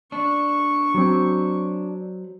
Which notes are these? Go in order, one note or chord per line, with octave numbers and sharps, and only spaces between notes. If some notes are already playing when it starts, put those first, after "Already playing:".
D4 C#6
F#3 C4